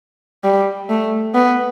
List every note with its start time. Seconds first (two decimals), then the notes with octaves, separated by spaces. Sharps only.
0.44 G3
0.89 A3
1.35 B3